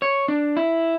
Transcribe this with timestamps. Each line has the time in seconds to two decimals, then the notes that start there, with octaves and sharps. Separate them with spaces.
0.02 C#5
0.28 D4
0.57 E4